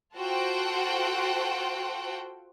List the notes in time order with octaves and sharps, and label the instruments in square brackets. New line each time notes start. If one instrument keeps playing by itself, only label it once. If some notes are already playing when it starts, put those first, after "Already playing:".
[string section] F4 F#4 A4 C5 F#5 G5